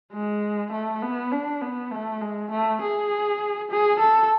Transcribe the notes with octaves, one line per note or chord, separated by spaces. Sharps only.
G#3
A3
B3
D4
B3
A3
G#3
A3
G#4
G#4
A4